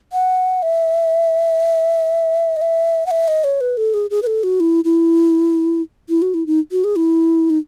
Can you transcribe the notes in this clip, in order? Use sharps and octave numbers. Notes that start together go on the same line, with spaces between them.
F#5
E5
D#5
E5
F#5
E5
D#5
C#5
B4
A4
G#4
G#4
B4
A4
F#4
E4
E4
E4
F#4
E4
D#4
F#4
G#4
E4
D#4